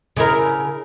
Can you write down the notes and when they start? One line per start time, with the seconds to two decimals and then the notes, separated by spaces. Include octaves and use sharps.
0.16 C#3 E4 A#4